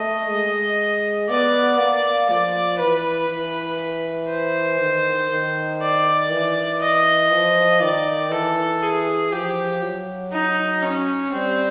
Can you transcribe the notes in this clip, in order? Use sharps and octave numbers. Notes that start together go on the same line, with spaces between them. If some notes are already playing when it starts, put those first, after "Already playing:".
Already playing: A3 D#5
G#3
B3 D5
A#3
F3 D5
E3 B4
E3
C5
D#3
D#3
D5
E3
D#5
F3
D#3 D5
E3 A4
G#4
F3 G4
F#3
D#4
C#4
G3 C4